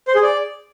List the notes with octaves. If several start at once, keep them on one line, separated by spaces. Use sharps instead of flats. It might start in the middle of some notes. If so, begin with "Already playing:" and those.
C5
G#4
D5